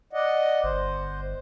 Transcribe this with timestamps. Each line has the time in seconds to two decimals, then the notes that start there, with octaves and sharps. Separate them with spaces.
0.13 D5 D#5 F#5
0.63 G1 C5